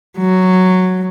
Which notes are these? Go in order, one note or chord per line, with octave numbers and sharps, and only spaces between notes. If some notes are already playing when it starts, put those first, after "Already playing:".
F#3